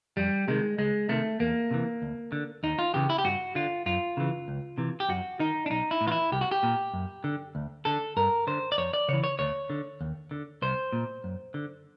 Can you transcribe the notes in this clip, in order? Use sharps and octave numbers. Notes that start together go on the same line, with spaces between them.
F2 G3
C3 D#3 G#3
C#2 G#3
C3 D#3 A3
E2 A#3
C3 E3
D2
D3
D#2 D#4
F4
C#3 E3 G4
E4
G4
G2 F#4
D3 F4
F#2 F4
C#3 E3
C#2
C3 E3
G4
F#2 F#4
D#3 D#4
D4
B1 D#4
E4
A2
E3 F4
E4
C2 G4
F#4
G4
A#2
F#2
D3
D2
D3 A4
G2 A#4
D3 C5
D5
F2 C#5
D5
C#3 E3 C#5
C#5
D2 C#5
D3
D#2
D3
C2 C5
A#2
F#2
D3